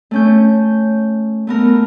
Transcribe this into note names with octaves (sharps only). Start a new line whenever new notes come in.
A3 C#4 G6
A3 B3 A#4